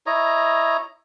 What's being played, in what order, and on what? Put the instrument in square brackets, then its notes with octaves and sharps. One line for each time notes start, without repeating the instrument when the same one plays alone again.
[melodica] E4 C#5 D#5 A#5